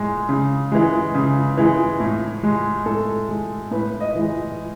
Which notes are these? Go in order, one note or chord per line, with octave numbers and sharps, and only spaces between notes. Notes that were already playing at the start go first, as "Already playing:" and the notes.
Already playing: A2 G#3
C#3
E3 G#3
C#3
E3 G#3
A2
G#3
A2 A4
G#3
A2 B4
D#5
E3 G#3